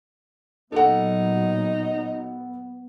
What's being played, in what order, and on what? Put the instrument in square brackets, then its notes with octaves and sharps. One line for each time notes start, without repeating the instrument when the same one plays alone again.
[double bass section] A#2 F#3 [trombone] B3 [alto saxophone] D#4 [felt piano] A4 F#5